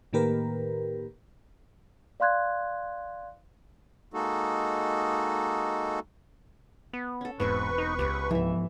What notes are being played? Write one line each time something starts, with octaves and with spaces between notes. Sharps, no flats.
A2 D#3 A#3 G4 A#4 B4
D5 F5 C6 F#6 G#6
G#3 A#3 D#4 F#4 A4
B3
C#4 A4
E1 G#2 B3 C4 F#4 B4 C#6
D#4
C#2 G4 D5 F#5
G#2 E3 F3 E5